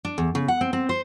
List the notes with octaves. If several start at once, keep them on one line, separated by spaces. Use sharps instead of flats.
D4
E2
C#3
F#5
C4
C4
C5